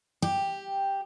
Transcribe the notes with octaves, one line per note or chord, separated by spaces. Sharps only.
G4